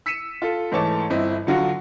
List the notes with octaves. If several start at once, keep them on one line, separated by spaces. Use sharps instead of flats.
E6 B6 C#7 D#7 E7
F4 A4
G#2 E3 A3 C#5 A5 D6
G1 C4 E4 D#5
D3 F#3 F4 F#4